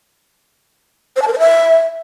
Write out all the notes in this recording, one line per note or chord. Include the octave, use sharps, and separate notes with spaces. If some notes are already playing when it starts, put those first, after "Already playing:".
C5
A5
A#4
C5
E5